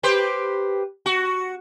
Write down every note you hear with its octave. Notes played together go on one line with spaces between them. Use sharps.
G4 B4 C5
F#4